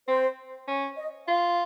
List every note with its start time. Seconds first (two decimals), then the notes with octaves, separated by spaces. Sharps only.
0.08 C4 C5
0.68 C#4
0.97 D#5
1.27 F4 F5